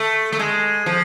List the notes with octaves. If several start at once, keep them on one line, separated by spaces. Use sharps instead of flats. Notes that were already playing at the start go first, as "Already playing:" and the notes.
Already playing: A3
A3
G#3
F3